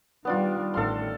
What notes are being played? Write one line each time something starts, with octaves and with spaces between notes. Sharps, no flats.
D#3 G3 B3 D4 F4
A1 D#3 A4 F5 C6